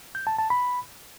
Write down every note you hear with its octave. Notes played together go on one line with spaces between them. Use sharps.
G6
A5
A5
B5